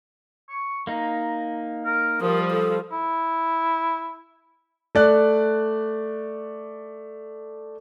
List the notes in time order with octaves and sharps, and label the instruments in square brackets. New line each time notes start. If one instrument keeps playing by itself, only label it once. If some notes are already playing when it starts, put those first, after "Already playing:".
[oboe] C#6
[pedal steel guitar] A#3 D#4 [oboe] A#5
[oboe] A#4
[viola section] F3 G3 [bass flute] A#4 [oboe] D#6
[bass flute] A4
[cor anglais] E4
[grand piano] A3 D5 F#6